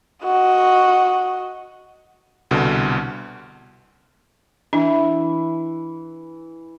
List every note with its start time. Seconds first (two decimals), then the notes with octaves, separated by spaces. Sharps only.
0.24 F#4 D#5
2.51 C2 B2 D3
4.73 E3 D4